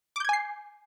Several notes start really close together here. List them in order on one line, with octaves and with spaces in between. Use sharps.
D6 G6 G#6 G#5 C7